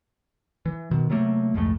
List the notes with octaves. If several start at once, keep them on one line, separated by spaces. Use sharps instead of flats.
E3
B2 D#3
C3 F#3 A3 A#3
C2 F2 G#2 A3